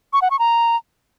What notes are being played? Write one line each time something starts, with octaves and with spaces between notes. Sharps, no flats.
C#6
F#5
C#6
A#5